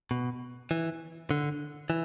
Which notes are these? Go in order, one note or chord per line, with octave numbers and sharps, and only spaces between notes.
B2
E3
D3
E3